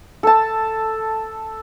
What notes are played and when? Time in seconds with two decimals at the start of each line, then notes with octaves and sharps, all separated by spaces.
0.23 A4 A5